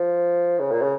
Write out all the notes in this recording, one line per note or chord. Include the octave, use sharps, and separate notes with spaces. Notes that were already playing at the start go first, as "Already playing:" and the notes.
Already playing: F3
C#3
A#2
C#3